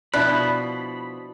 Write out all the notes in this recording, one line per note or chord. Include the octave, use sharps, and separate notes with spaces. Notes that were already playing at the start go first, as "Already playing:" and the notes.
B2 F3 D4 E4 B5 F#6